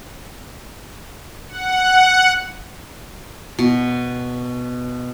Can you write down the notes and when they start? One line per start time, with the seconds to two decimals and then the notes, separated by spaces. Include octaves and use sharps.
1.49 F#5
3.59 B2